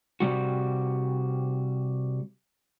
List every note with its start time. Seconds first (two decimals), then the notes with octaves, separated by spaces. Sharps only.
0.20 C3 G3 F#4